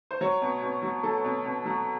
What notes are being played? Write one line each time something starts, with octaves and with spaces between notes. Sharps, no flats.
C5
F#3 C#5
B2
B2
F#3
F#3 A4
B2
B2
F#3